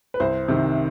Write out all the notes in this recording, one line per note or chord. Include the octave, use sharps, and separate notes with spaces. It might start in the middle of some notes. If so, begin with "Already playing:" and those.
B4
C2 C5
C3 D#3